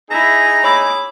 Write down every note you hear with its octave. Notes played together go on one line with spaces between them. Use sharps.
D#4 E4 G#4 A#5
C#5 B5 D6 E6